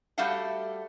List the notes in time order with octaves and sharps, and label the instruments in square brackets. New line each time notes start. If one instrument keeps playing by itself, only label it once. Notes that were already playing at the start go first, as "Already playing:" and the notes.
[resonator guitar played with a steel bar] G3 A3 F#4 G4 F5 F#5